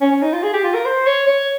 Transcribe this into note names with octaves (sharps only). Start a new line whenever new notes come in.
C#4
C#4
D#4
F4
G#4
G4
F4
A#4
C5
C#5
C#5